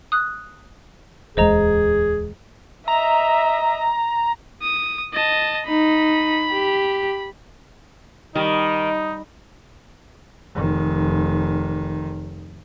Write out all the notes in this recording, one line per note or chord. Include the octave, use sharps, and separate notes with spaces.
D#6 F#6
D1 E2 G#3 G#4 C5 D#5 A#5
D#5 E5 A#5
D#6
D#5 A5
D#4 B5
G4
D#3 G3 D#4 D#5
F1 D#3